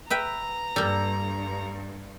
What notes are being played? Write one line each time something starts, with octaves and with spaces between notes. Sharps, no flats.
B4 E5 G5 A#5
G2 G3 A#3 A4